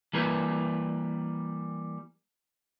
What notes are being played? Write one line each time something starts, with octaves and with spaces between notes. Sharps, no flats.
E3 G3 A#3 B4